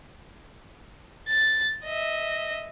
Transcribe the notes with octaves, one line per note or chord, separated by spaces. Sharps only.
A6
D#5 E5